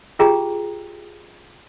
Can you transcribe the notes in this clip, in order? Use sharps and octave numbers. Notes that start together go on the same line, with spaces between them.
F4 G4 G#4 G5 A#5